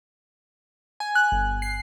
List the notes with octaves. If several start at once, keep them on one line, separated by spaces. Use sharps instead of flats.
G#5
F#6
G1
C7